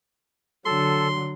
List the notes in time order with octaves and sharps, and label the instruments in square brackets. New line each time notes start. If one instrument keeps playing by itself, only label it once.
[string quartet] D3 F#3 [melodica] A4 [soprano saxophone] C6